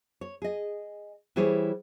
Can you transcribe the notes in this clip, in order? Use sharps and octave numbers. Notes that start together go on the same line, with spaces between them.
C#5
G#4 D#5
E3 G3 E4 G#4 C5 C#5